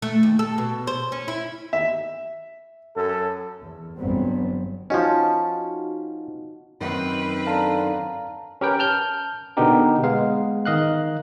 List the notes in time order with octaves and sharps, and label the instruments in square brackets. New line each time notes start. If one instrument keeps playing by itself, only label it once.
[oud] A3
D#2
A4
B2
C5
C#4
E4
[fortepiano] E5
[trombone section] F#2 A4
[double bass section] E2
G1 F#3 G3 B3 C4
[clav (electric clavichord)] F3 C#4 [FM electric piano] D#4 F#4 [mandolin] A5
[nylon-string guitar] F#2 D#3 [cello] C4 B4
[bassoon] D3 [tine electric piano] F5 A5 A#5
[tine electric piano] C#4 G4 A#4 B4 G5
A5 F6 G6
B2 D3 B3 D#4 G4 A#4
G#3 B3 F5
D#3 D#5 F5 F#6